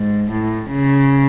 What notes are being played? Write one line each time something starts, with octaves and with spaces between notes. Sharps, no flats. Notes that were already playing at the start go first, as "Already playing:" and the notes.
Already playing: G#2
A2
C#3